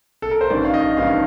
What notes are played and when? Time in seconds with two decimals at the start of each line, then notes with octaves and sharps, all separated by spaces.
0.22 A4
0.31 A#4
0.41 C5
0.50 A1 G2 D#3 D5
0.65 F5
0.74 D#5
0.97 A1 G2 D#3 F5